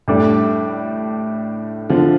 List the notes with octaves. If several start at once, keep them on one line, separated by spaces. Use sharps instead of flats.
A2 G3 D4 A4 D5
D3 F3